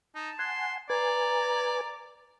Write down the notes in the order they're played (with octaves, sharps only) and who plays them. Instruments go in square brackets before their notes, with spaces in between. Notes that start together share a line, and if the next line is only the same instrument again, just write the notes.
[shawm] D#4 [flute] A5
[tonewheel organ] F#5 G#5 [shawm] C6
[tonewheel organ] B4 G#5 [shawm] D5 [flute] A#5